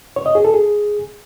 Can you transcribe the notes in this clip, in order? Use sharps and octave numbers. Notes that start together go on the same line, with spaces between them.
C#5
D#5
G#4
A4
G#4